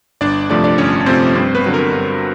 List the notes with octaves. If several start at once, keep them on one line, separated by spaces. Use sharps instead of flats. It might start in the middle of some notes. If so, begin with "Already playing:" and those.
G1 D4 D5
F2 C3 F3 A3 D4 D5
D4 D5
G1 C#4 C#5
F2 C3 F3 A3 C4 C5
G2 C4 C5
B3 B4
D3 F#3 B3
A#4
G2